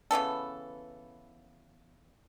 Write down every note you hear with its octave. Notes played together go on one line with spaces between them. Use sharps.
C#3 E3 B3 A4